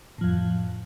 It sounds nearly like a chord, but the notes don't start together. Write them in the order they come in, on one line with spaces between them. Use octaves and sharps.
A2 F3 F2